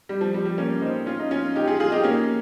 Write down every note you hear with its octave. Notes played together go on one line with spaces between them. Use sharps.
G3
F3
G3
G3
A#3 C#4
C4 D#4
C#4 F4
D#4
C#4 F4
D#4 G4
F4 G#4
F4 G#4
D#4 G4
A#3 C#4